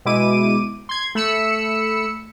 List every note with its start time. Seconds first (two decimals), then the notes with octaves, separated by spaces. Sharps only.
0.05 B2 G#3 E4 D6 D#7
0.89 C6 G#6
1.15 A3 B5 E6 C#7